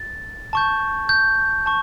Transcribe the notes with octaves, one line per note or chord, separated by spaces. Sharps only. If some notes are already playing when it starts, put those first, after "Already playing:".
Already playing: A6
A5 C#6 G6
G6
A5 C#6